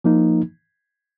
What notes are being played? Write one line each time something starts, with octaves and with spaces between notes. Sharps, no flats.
F3 A#3 D#4